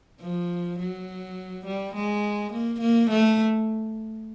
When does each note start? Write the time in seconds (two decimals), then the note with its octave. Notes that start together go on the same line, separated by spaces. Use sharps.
0.20 F3
0.79 F#3
1.66 G3
1.95 G#3
2.53 A#3
2.81 A#3
3.11 A3